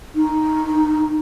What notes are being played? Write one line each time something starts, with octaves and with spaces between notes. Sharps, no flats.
D#4